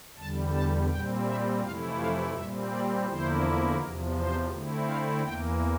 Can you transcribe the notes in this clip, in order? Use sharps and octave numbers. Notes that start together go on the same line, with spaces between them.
E2 D3 G3 A5
A5
A#2 G3 C4 G5
E5
F2 C3 E3 A3 E4 F5
F5
A#2 G3 C4 E5
D5
E2 D3 F3 A#3 E4 C5
E2 C3 F3 A#4
C5
D3 A3 C4 E4
F5
E2 E3 A#3 G5